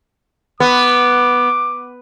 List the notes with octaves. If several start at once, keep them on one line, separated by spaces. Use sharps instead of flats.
B3 D6